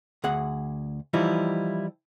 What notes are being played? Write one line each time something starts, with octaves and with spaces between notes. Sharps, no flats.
D2 G#4 F#5
E3 F3 G3 D#4 E4